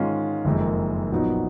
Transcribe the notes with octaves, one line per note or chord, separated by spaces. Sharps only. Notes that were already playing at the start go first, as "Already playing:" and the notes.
Already playing: G#2 D#3 G#3 C#4 F4
F#1 F2 D#3 G#3 D#4
A#1 A#2 F#3 B3 D#4